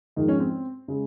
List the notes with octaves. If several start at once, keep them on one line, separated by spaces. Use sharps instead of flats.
G#2 D#3 F3 G#3 D#4
C#4
C4
C#3 G#3